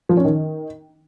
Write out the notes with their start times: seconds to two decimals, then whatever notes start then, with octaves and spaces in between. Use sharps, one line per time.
0.09 F3
0.17 C#4
0.25 D#3